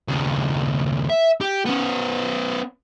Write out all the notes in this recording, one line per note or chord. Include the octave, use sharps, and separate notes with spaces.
D#2 C#3
E5
G4
B3 C#4